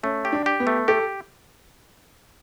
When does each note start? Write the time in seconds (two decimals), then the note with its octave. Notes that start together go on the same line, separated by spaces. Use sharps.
0.03 A3 C#4
0.25 G4
0.32 D4
0.46 G4
0.60 B3
0.67 A3
0.88 G4 A4